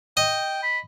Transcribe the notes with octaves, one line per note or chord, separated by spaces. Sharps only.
D#5 G5
B5